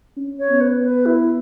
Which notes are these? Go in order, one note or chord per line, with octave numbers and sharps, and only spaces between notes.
C#4
C#5
B3
B4
B4
E4